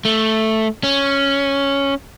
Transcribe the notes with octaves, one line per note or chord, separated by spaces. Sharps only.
A3
C#4